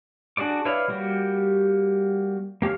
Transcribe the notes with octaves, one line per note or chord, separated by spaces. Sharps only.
D4 F#4 G#4 D5 D6
E4 B4 C#5 D5 F5
G3 A#3 F#4 G4
A#3 G4 C#5 F5